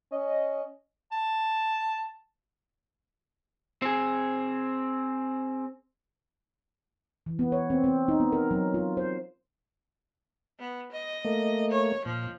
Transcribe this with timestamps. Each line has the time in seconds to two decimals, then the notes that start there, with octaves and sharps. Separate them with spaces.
0.12 C#4 D#5
1.12 A5
3.82 C4 G#4
7.26 E3
7.39 B3
7.52 C#5
7.70 C4
7.84 C4
8.08 D#4
8.20 B3
8.32 A#4
8.51 F#3
8.74 F4
8.97 C5
10.60 B3
10.92 D#5
11.25 A3 A#3
11.71 C#5
12.06 A#2 F3